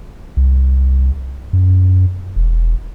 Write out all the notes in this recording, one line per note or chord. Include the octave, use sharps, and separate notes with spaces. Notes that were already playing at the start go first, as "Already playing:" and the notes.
C2
F#2
E1